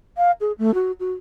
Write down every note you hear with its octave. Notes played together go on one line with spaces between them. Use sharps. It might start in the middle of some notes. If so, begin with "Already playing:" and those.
F5
G#4
A3
F#4
F#4